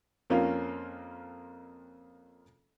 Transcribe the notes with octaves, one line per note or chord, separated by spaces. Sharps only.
F2 A#3 C4 C#4 F4 F5